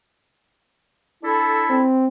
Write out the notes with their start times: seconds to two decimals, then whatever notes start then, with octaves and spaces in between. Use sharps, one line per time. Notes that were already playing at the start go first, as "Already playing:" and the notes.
1.23 D4 E4 A4
1.70 C4